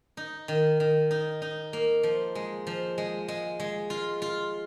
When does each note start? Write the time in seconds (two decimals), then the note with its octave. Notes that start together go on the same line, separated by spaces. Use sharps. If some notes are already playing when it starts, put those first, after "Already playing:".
0.17 D#4
0.48 D#3
0.80 D#3
1.11 D#4
1.42 D#4
1.73 A#3
2.03 F3
2.35 G#3
2.67 F3
2.98 G#3
3.28 G#3
3.60 G#3
3.90 F4
4.22 F4